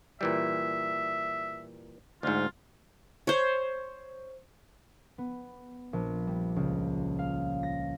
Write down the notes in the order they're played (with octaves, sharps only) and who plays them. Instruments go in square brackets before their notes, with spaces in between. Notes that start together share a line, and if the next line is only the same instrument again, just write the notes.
[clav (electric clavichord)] A#2 E3 G3 [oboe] E5
[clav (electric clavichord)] D2 G#2 [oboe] F4
[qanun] C5 C#5
[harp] B3
A#1
G3
C#2
F5
A#6